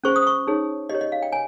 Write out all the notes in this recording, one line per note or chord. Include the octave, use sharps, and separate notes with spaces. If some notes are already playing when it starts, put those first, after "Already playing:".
C#4 G#4 C5 C#6
D#6
C#6
D#4 G#4 C#5
G4 C#5 D#5
D#5
F5
G5
C#5 G#5